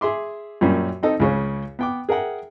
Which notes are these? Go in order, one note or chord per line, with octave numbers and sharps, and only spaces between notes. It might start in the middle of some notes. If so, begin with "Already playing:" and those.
G#4 E5 C6 D6
F#2 A#2 G3 A#3 C#4
C4 D#4 A4
C#2 C#3 C#5
B3 G5 D6
G#4 A#4 E5 F#5 G5